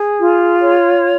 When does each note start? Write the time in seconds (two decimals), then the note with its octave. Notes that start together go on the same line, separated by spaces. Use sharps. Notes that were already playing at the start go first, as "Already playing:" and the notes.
Already playing: G#4
0.19 F4
0.62 C#5